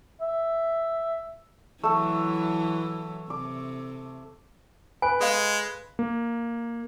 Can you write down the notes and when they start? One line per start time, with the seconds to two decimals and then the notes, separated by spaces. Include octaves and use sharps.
0.21 E5
1.84 E3 F#3 A3 E4 A4
3.30 C3 D6
5.02 B4 G#5
5.21 G#3 A4 F5
5.99 A#3